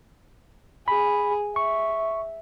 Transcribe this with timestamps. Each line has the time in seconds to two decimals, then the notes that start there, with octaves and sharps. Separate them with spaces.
0.88 G#4 B5
1.56 E5 C#6